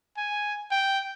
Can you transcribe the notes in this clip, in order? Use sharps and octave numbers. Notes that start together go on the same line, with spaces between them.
G#5
G5